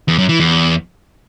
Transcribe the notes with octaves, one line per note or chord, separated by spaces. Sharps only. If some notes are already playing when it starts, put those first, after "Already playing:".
E2
F#2
E3
E2